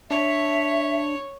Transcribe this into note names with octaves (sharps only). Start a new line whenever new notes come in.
D4 C#5 E5